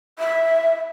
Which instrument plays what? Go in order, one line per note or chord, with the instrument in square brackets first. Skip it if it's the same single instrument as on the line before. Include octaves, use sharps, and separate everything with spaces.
[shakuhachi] E5